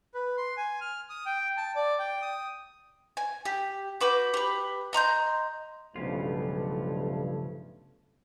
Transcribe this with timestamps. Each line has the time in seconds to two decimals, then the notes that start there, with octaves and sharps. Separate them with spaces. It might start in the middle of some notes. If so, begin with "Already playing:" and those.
0.14 B4
0.37 C6
0.57 G#5
0.81 F6
1.09 D#6
1.26 G5
1.57 A5
1.76 D5
1.99 G5
2.22 D#6
3.17 G#5
3.45 G4
4.01 F#4 B4 D6 G6
4.34 G4 B4
4.93 D#5 A#5 C6 G6
5.96 B1 G2 C#3 F3 A3 C#4 F4